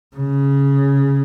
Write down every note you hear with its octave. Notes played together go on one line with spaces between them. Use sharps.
C#3